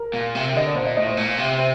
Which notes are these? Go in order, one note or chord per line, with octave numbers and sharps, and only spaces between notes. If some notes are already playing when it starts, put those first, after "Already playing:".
Already playing: A#4
A#2
C3
D3 D#5
D5
A#2 C5
D#5
A2 D#5
C5
A#2
C3
C5